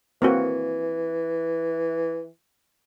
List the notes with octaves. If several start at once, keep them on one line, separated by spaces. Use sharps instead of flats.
E3 A#3 C4 F#4